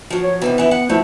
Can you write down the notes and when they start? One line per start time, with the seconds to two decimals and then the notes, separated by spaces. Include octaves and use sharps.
0.10 F3 F#3
0.23 C#5
0.42 C3 D#3 E3 B3
0.58 E3 E4
0.71 F#5
0.89 F3 A3 C4 E4